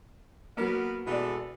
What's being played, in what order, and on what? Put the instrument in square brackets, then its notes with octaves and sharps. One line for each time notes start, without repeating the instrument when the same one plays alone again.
[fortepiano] F#3 A#3 [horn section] B3 A#4 F#5
[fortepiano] B2 D5 [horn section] E3 G#3 A4